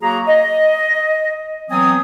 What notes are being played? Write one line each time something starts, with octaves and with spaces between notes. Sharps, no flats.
F#3 A#3 F#4 G#4 A#5
D#5
E3 F#3 B3 C4 G#5 D#6